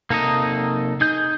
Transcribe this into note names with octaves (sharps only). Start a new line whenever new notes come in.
C3 A#3 D#4 A4 D#5 A#5
D#4 G#4 G6